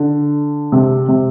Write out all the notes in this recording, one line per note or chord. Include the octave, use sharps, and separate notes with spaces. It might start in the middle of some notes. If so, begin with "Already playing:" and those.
Already playing: D3
C3
C3